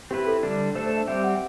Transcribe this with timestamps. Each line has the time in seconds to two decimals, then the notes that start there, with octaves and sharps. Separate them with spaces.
0.11 C4 E4 G4 B4
0.27 A4
0.43 D3 G3 D4
0.75 A3 D4 A4 C5
0.86 C5
0.97 E5
1.08 G3 C4 G4 E5
1.24 F#5